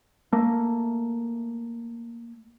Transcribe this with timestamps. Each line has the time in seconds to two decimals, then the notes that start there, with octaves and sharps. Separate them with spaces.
0.33 A3 A#3